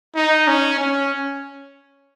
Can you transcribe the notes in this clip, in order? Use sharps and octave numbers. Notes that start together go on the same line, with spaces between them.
D#4
C#4
C#4